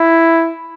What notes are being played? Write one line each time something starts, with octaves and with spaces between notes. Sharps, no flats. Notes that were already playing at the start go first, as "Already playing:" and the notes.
Already playing: E4